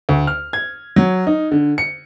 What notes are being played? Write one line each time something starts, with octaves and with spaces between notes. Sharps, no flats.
D2
F6
G#6
F#3
D#4
D3
C#7